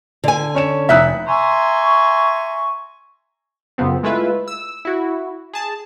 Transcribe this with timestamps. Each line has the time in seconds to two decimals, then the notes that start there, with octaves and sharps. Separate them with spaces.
0.24 D3 G#5
0.55 C#4 C#5 E7
0.89 F1 D#4 E4 E5 F#6
1.27 E5 G#5 A#5 C6 C#6
3.78 F#2 C#3 F3 B3 C4
4.03 G#3 A3 E4 F4 B4 E5
4.48 E6
4.85 E4 F#4
5.53 G#4 A5